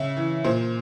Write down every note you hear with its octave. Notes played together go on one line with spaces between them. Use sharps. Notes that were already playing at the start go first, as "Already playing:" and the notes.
Already playing: C#3 E5
E3
A#2 C5